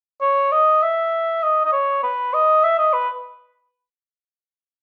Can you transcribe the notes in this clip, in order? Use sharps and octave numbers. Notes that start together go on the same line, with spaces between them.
C#5
D#5
E5
D#5
D#5
C#5
B4
D#5
E5
D#5
B4